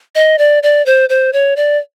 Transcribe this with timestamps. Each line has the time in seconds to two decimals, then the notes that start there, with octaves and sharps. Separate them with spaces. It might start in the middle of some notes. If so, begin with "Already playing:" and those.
0.15 D#5
0.38 D5
0.63 D5
0.86 C5
1.09 C5
1.33 C#5
1.56 D5